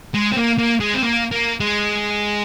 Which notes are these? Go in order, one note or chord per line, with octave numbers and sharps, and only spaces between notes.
G#3
C4
A#3
A#3
G#3
C4
A#3
A#3
G#3